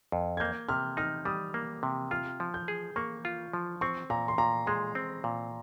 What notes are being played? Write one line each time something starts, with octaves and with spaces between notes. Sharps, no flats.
F2
G#6
A#3 G6
C3 F6
D#4 F6
G3 D#6
A#3
C3
F4 F6
F3
G6
G#4
A#3 C#6
F4
F3
C4 C#6
A#2 A#5
C6
A#2 A#5
G#3 C6
C4
A#2